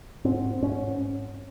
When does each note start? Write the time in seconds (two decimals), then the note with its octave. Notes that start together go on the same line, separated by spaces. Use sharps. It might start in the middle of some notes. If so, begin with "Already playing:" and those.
0.25 G#2 C4
0.62 G#2 C#4